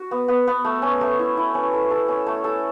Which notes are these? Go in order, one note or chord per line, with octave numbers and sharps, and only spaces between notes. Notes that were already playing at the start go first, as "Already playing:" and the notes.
Already playing: F#4
B3
B3
B3
A3
C#4
A3
E4
E4
C#4
A4
A4
C#4
A3
A4